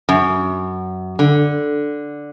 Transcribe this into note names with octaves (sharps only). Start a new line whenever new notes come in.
F#2
D3